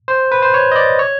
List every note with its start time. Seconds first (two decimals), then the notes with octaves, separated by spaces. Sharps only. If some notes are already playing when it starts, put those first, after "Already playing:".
0.08 C5
0.32 B4
0.42 C5
0.54 C#5
0.72 D#5
0.76 D5
0.99 C#5